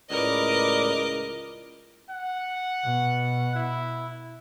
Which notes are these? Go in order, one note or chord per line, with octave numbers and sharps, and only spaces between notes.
C#2 A2 A#4 B4 D5 D#5 D6
F#5
B2
E4